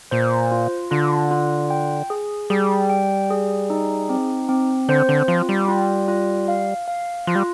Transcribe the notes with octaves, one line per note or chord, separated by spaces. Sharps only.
A#2 C5
F4
D3 F4
F4
G5
G#4
G3 G#4
G5
G#4
D#4
C4
C4
D3 C5
D3
F3 F4
G3
F4
F4
F5
F5
F3 F4
G3